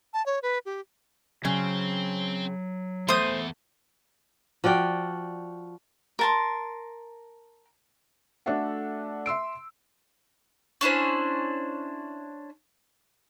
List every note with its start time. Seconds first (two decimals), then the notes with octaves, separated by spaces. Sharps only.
0.14 A5
0.26 C#5
0.43 B4
0.66 G4
1.45 C#3 F#3 C4
3.08 E2 A3 C5 D#6
4.64 F3 F#4 D5 G5
6.19 A#4 A5 C6
8.46 A3 D4 F#4 A4 E5 F#5
9.26 E5 C6 E6 D7
10.81 C#4 D4 E4 C5